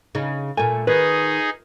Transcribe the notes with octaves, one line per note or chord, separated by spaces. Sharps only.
C#3 D#4
A#2 A3 G#5
D#3 D#4 G#4 B4